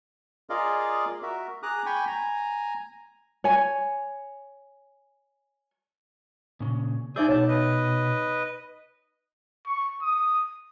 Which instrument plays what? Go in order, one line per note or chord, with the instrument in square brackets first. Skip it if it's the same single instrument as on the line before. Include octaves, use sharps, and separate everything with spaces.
[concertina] F4 G#4 A#4 D5 D#5 F5
F#4 A#4 E5
G#4 A#5 D6 D#6 F#6
G5 G#5 B5 C#6
G#5 A#5
[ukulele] C#5 G#5
[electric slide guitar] A#2 C#3
[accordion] F3 D5 G6 [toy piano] D#4 E5 E6 [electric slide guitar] G#4
[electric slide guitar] B2 [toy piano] C#5 [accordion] A5
[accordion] B4 D#5
[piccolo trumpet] C#6
D#6